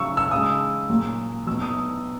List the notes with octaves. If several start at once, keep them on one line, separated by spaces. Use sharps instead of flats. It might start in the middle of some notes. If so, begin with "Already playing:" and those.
Already playing: C#3 F#3 C#6 E6
E6
C#3 G#3 D#6
A#2 F#3
B2 F#3 E6
D#6